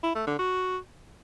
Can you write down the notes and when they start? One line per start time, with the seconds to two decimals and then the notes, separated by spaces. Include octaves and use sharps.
0.03 E4
0.15 A3
0.27 D3
0.39 F#4